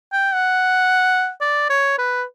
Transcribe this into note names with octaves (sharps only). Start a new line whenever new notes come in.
G5
F#5
D5
C#5
B4